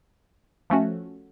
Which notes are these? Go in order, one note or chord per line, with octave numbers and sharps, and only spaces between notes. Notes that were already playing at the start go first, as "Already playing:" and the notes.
F3 A3 C#4 F#4